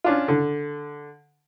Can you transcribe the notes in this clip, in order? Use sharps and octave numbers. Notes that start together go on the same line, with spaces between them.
C#4 D4 F4
D3